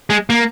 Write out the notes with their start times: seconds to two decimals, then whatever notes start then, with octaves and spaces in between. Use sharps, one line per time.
0.10 G#3
0.30 A#3